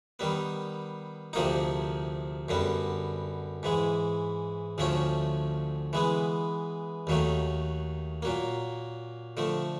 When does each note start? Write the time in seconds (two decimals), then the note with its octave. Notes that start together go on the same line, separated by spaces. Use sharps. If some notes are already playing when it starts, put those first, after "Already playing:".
0.19 D#3 G3 B3
1.33 D2 C3 F3 A#3 D#4
2.48 F#2 D3 G3 B3
3.63 G#2 E3 G#3
4.78 D2 D3 F3 A3 C#4
5.93 E3 G#3 B3
7.07 D#2 D#3 F#3 A3
8.22 A#2 F#3 A#3
9.37 D3 F3 A3